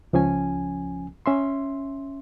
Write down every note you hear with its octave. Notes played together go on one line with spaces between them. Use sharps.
C#2 F3 C#4 G#5
C#4 E5 C6